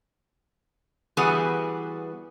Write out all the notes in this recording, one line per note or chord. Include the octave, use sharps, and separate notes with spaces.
E3 G3 B3 F#4 G#4